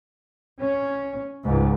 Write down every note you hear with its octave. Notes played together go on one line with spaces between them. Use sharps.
C#4
C#2 G#2